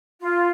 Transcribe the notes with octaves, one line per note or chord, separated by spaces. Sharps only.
F4